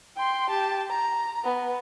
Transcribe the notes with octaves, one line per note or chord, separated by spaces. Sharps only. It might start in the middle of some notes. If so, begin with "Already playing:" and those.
G5 C6
G4 A5
A#5
B3